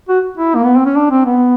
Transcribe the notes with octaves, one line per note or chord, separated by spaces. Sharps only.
F#4
E4
A#3
B3
C4
C#4
D4
C4
B3